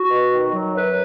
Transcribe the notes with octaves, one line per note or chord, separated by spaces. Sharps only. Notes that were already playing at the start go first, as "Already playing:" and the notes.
Already playing: F#4
B2
D#3
F#3
F#2 B4